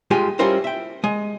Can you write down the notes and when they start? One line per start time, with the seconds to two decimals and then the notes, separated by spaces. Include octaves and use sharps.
0.11 G2 G#3 F4 G4 G#5
0.39 G3 C#4 E4 F4 A#4 C5
0.64 E5 G5
1.04 G#3 D#5